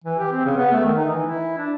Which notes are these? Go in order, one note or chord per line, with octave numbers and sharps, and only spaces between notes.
E3
G4
C4
C#3
B3
A3
D#3
D#4
E3
E4
D4